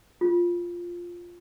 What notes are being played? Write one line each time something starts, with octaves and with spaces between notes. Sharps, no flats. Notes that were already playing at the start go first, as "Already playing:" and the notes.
F4